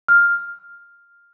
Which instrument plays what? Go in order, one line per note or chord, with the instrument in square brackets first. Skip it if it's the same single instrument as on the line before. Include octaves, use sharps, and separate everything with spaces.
[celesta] F6